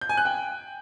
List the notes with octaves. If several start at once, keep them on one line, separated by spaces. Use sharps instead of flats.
G6
G#5
F#6
G5